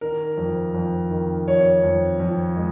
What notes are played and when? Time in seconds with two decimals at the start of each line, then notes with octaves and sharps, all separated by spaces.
0.01 D#3 A#4
0.37 F2
0.74 F2
1.11 D#3
1.47 F2 C#5
1.83 F2
2.20 F2
2.56 G#3